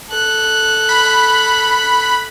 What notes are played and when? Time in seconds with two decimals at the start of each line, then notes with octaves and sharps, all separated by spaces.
0.11 A4 F#6
0.89 B5